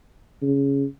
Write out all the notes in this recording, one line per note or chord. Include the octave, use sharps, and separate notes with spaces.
C#3